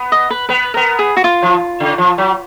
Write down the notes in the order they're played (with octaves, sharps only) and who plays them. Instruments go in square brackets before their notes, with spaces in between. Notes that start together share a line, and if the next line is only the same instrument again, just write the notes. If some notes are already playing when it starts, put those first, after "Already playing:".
Already playing: [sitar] B3
[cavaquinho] D#5
B4
[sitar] B3 [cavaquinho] B4
[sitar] B3 [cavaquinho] A#4
[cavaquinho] G#4
F#4
F4
[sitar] F3
C#3
F3
F#3